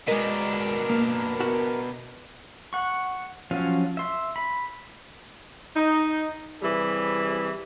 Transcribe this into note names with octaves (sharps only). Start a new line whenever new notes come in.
B2 G#3 D4 A#4 D#5
A#3
B3 F#4 E5
F#5 C#6
F3 F#3 C#4 F5
E5 C6
B5
D#4
C3 E3 G3 G#4